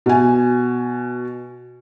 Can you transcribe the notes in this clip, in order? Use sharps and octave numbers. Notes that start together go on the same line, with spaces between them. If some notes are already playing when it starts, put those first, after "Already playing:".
B2 G#5